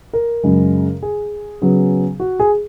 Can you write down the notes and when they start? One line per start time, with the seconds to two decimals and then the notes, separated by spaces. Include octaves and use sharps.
0.13 A#4
0.43 F#2 C#3 G#3
1.03 G#4
1.62 C#3 F#3 B3
2.20 F#4
2.40 G#4